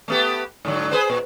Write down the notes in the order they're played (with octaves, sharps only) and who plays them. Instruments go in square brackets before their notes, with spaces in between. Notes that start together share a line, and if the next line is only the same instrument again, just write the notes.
[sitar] A3 B3 G4
G#2 D3 F#3
G#4 B4 C5
A#2